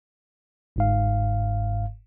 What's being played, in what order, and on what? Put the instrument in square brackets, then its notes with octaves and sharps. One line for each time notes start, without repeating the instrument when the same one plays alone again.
[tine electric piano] G1 G#2 F5